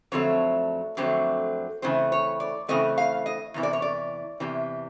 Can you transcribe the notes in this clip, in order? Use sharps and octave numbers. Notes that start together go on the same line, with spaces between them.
F2 D3 F#3 A3 C4 C#5
F2 D3 F#3 A3 C4
C#3 E3 A3 C4 C5
C#5
D5
C#3 E3 A3 C4 D#5
F5
D#5
E2 C3 E3
D5
C#5
D5
E2 C3 E3